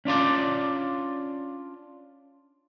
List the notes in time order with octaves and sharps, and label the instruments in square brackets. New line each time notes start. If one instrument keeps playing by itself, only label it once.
[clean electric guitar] C#4 D4 F4 D5